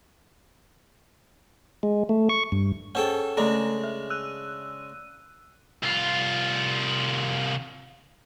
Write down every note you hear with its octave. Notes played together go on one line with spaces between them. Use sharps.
G#3
A3
C#6
G2
C#4 G#4 A4 C5 F#5 G5
C#3 G#3 A3 D4 A4
E5
E6 F#6 D#7
C2 F4